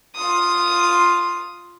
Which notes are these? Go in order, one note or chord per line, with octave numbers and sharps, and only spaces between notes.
F4 D#6